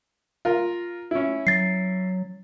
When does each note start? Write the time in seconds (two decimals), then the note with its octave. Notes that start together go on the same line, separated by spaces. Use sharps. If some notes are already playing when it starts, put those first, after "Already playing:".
0.45 F4 A#4
1.11 C#4 E4
1.47 F#3 A6 C7